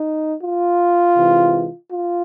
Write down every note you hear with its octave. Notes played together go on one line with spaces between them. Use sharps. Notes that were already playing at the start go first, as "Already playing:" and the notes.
Already playing: D#4
F4
C3 E3 G#3
F4